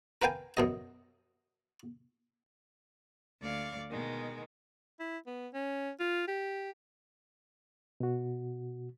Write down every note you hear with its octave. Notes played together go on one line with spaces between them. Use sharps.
A#4 B4 F5 G5 G#5
F#2 B2 D#5
D2 D5 F5 C#6 D6
B2 D#3 G#3
E4
B3
C#4
F4
G4
B2 F#4